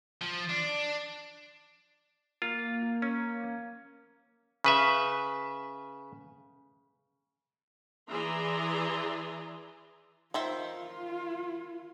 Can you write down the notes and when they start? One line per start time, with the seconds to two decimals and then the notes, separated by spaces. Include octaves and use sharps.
0.21 F3
0.49 D4
2.42 A#3 F4
3.02 C#4
4.64 C#3 B4 E5
8.09 E3 G#4 D5 E5 A#5 C6
10.34 D#3 F4 C5 E5